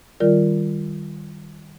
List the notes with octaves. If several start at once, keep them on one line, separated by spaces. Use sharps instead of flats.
D#3 G3 F4 A#4 D5